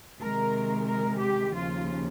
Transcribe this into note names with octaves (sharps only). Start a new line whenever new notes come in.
C3 D#3 G#3 A#4
A#4
G4
D#2 C#3 F3 F4